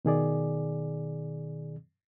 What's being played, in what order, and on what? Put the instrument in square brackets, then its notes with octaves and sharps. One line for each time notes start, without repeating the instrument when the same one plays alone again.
[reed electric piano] B2 D#3 G#4 D5